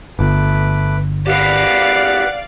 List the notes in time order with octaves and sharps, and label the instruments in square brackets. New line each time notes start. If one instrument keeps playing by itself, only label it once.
[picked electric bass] G1 [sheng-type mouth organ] A3 B4 D6
[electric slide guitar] G4 A#4 B4 [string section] D5 F5 [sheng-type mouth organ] F#5